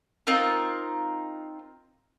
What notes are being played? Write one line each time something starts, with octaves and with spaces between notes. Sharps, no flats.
C4 D#4 F4 A#4